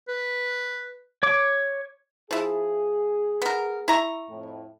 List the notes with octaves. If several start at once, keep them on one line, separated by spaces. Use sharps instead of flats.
B4
C#5 D6
F3 E4 G#4
B3 A#4
E4 A#5 C#6
F2 A2